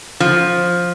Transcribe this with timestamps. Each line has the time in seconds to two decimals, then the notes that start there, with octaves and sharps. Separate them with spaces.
0.20 F3